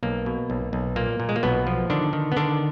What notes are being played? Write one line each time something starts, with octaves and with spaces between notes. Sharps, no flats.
B1 A#3
B2
B1
B1
A#2 A#3
A#2
G#3
A#3
B1 B2 B3
F3
D3 D#3 D4
D#3
B3
D3 D#3 D4